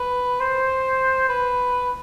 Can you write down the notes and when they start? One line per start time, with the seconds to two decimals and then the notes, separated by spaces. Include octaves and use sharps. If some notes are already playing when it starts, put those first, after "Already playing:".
Already playing: B4
0.40 C5
1.29 B4